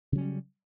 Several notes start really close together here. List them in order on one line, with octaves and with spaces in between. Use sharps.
C#3 F#3 C#4 G3